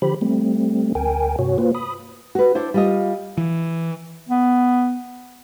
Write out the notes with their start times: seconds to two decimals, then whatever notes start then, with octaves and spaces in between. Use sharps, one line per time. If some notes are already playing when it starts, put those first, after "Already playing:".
0.02 D3 F3 G4 C5 B5
0.21 G3 A3 C4
0.95 D2 A#4 G5 G#5
1.39 G2 C3 F#4 C#5
1.58 A#3 F4 B4 C5
1.75 B5 D#6
2.35 F#4 B4
2.55 D4 E4 C5 C#5
2.74 G3 F4 D#5
3.38 E3
4.29 B3